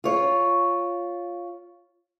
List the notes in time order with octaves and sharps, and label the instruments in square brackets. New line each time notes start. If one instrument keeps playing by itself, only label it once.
[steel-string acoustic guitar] F4 C#5